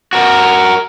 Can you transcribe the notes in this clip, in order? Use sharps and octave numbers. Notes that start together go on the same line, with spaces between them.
F#4 A#4